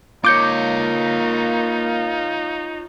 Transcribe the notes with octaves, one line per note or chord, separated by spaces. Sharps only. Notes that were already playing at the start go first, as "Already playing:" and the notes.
A#3 D#4 F4 C#5 D6 G6 C#7